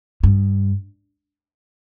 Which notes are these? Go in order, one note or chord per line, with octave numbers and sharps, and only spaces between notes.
G2